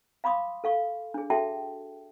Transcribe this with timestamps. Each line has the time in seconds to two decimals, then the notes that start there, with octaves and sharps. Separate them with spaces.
0.24 F5 B5 C6 D6 D#6
0.64 A4 F5 C#6
1.14 D4 G#4
1.30 F#4 G#4 A4 E5 G5 A5